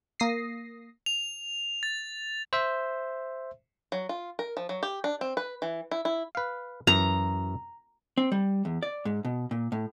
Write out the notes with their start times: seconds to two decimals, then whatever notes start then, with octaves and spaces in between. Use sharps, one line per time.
0.20 A#3 D#6 A#6 C7
1.06 F7
1.83 A6
2.53 C5 E5
3.92 F#3
4.09 F4
4.39 A#4
4.57 F3
4.69 F#3
4.83 G4
5.04 D4
5.21 C4
5.37 B4
5.62 E3
5.91 E4
6.05 E4
6.35 B4 F5
6.87 F#2 E3 A#5
8.18 C4
8.32 G3
8.65 E2
8.83 D5
9.05 G#2
9.25 B2
9.51 A#2
9.72 A2